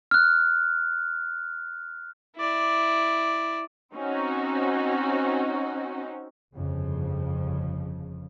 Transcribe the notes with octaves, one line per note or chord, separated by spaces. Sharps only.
F6 F#6
E4 D5
C4 C#4 D#4 F#4
G1 F2 C#3 F3